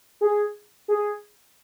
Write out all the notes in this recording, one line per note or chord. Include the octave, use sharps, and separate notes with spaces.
G#4
G#4